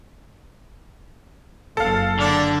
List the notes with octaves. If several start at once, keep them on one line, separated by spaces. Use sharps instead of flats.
F#1 A4 F5
D3 D4